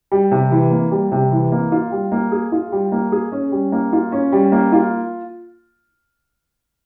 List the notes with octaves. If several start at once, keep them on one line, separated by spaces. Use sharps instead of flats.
G3
C3
E3
A#3
G3
C3
E3
A#3
F4
G3
A#3
G#4
F4
G3
A#3
G#4
C#4
G3
A#3
F4
C#4
G3
A#3
F4